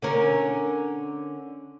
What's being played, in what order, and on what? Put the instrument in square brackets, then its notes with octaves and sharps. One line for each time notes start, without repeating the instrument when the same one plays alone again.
[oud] D3 C#4 A#4